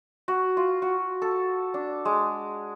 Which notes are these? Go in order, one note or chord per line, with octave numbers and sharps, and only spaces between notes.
F#4
F4
F#4
A4
D4
G#3